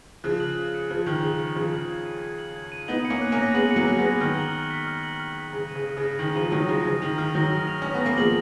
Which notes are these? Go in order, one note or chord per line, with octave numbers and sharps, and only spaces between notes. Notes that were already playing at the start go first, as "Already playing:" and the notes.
C#3 F3 F#6
F#7
F#6
C#7
C#3 F3 F#6
D#3 F#7
C#3 F#6
C#7
C#3 F3 G#6
F#7
G#6
D#7
G#6
F#7
G#6
D#7
B3 D#4 F#7
C#7
A#3 C#4
F#6
A#3 C#4
A#6
G#3 B3 F#7
C#7
F#3 A#3
F#6
G#3 B3
A#6
D#3 F6
F#7
F6
B6
F6
F#7
F6
B6
C#3 F#7
D#7
C#3
D#6
C#3
A#6
D#3 F#7
C#3 F3 D#7
D#3 F#3 D#6
C#3 F3 A#6
C#3 F6
D#3 F7
D#3 F6
D#3 F#3 A#6
F6
F7
C#4 F6
B3
A#3 A#6
F3 G#3 F#7